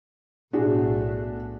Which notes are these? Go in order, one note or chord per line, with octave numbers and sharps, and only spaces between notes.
B1 A2 A3 D4 F#4 G#4